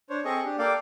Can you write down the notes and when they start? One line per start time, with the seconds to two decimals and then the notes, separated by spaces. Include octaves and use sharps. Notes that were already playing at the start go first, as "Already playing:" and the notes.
0.10 D4 C5 C#5
0.25 C4 G#4 A4 D#5 C#6
0.44 D4 G4
0.58 A#3 A4 D5 F5 G5